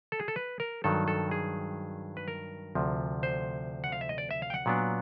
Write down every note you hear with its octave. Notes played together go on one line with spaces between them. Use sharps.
A4
G#4
A4
B4
A#4
G2 D#3 F#3 A4
A4
G#4
B4
A#4
D2 C3 F3
C5
F#5
F5
E5
D#5
D5
E5
F5
G5
F#5
A#2 F#3 B3 D4